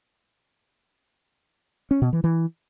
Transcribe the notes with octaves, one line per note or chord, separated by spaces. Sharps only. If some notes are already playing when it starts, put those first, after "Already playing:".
C#4
B2
E3
E3